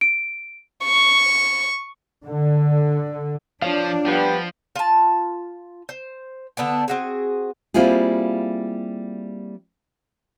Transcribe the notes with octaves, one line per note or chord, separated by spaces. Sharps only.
D7
C#6
D3
F3 D4 F4 C#5 F5
F3 G3 B3 G5
F4 A5
C5
D3 B3 D4 G5
C4 F#4 G#4
G3 A#3 C4 E4 F4 G#4